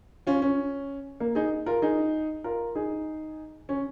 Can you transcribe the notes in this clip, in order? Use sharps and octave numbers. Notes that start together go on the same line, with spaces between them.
C#4 F4
C#4
A#3
D#4 G#4
F4 A#4
D#4 G#4
F4 A#4
D#4 G#4
C#4